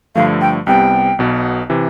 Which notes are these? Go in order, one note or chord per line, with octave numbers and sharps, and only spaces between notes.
G2 D3 F3 A3 F5
G5
C2 C3 G3 B3 G5
B1 B2 B3
C3 E3